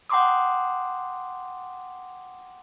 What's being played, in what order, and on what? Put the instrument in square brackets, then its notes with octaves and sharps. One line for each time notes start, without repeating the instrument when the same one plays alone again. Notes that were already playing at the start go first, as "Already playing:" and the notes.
[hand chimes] F#5 G5 A#5 C6 D6 D#6